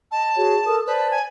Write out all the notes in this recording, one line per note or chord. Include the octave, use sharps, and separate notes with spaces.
D#5 A5
F#4 G#4 C#5
A4 A#4 D#6
B4 C5 D5 A5
G#5